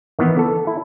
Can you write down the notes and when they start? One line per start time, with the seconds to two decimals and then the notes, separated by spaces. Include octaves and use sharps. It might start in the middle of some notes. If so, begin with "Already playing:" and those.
0.19 D#3 E3 B3
0.39 A4
0.67 E4